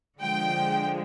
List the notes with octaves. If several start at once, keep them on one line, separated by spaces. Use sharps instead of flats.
D3 F3 G#3 G5